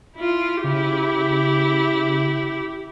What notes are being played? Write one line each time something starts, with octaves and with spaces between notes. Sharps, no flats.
E4 F4
C#3 E4 G4